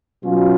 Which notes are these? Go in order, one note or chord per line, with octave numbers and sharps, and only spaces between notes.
B2 F#3 C#4 F4